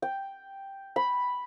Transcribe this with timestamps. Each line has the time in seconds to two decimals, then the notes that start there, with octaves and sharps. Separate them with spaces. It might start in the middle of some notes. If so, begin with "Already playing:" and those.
0.02 G5
0.96 B5